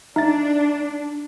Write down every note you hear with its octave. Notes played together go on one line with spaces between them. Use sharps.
D4 D#4 E5 A6